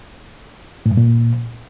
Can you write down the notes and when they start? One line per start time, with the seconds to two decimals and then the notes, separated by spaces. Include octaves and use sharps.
0.86 A2
0.91 G2
0.97 A#2